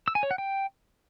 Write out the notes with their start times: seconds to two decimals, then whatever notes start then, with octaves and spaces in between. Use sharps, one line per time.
0.08 E6
0.15 G#5
0.23 C#5
0.31 F#5
0.38 G5